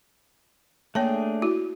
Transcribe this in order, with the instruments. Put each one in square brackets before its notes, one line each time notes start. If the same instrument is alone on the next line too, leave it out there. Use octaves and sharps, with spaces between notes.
[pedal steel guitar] A3 D4 G#4 [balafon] A#3 C#5 A5
[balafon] E4 F#4